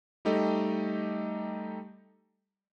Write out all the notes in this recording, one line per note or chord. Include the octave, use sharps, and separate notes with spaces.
G3 A3 D#4 G4 A4 D#5